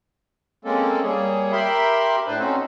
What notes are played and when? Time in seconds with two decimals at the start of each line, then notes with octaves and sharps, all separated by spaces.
0.65 G#3 A#3 C4 C#4 A4
1.03 G3 A#3 G#4 C#5
1.52 G4 A#4 E5 B5 C6
2.27 A2 D4 B4 C5
2.39 C4 C#4 D#4 F#4 A4 C5